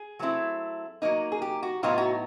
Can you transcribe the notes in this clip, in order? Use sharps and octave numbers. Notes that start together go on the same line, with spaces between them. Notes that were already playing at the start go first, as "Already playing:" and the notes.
Already playing: G#4
F#3 A3 C4 E4
F#3 A#3 D#4
G#4
G4
F#4
A2 F#3 B3 D#4 F4
F#4